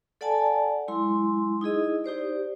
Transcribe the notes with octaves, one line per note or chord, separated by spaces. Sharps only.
A4 D5 F#5 G#5 A5
F#3 G#3 E4 C6
D#4 E4 G#4 D#5
D#4 G4 C5 D5